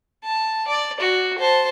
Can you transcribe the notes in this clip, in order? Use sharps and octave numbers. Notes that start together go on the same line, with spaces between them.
A5
D5
F#4
C5 A5